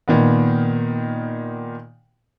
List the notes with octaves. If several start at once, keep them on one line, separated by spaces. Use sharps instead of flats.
A#2 D#3 B3